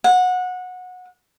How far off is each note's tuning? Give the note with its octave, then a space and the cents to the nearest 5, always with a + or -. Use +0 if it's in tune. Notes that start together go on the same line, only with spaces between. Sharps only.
F#5 -20